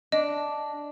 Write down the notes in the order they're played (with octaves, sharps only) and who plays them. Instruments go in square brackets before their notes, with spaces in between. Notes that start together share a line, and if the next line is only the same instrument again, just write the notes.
[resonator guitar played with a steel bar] D4 [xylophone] D#5